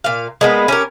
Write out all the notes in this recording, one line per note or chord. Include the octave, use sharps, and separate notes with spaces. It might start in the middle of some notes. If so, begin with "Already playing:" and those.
A#2 F5
G#3 A#3 B3
C#4 G4 A#4